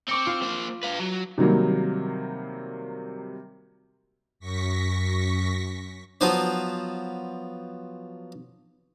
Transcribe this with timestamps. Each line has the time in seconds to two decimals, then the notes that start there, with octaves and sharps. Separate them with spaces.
0.09 C4 C#6 D6 C#7
0.27 F4
0.42 A#3 C5
0.83 B4 F5
0.99 F#3
1.38 C3 D#3 F#3 G3 A#3
4.39 F#2 C#6 A#6 B6
6.21 F3 F#3 B3 B4 C5